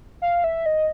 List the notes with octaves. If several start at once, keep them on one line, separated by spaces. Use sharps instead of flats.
F5
E5
D#5